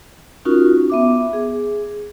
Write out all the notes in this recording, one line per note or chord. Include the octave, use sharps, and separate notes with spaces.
C#4 D#4 F4 F#4 A#4
B3 E5 D6
G#4